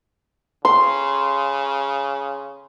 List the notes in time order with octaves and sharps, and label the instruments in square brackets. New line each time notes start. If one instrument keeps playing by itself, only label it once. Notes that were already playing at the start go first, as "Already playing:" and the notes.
[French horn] C#3 [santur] C6